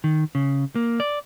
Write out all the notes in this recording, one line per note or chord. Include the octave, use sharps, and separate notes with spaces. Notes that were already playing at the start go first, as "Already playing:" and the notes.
D#3
C#3
A#3
D5